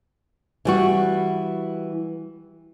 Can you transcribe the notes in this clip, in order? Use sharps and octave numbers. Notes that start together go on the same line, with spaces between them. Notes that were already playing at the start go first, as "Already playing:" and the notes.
E3 G3 F#4